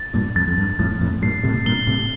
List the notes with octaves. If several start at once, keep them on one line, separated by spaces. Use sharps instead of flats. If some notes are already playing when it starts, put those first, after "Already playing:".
Already playing: A6
G2 A#2
F2 A6
F2
G2
F2 A2 A6
F2 A2
G2 A#2 C7
A2 C3
G2 A#2 G7
A2 C3